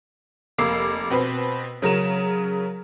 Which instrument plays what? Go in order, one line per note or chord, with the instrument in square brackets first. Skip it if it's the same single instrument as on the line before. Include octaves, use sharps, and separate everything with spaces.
[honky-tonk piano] F1 A#3 D6 E6 C7
B2 C4 B4
C#3 F#3 A#4 E7